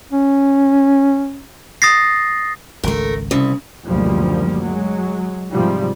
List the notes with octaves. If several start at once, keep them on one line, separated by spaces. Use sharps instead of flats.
C#4
D#6 A6 A#6 C7
G#1 C#2 A3 A#4
C2 C#3
F#1 D2 B2 F3 G3 A#3
F#3 G#3
G#2 C3 F3 G3